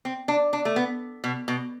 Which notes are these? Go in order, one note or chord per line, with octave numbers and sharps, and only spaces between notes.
C4
D4
D4
A3
B3
B2
B2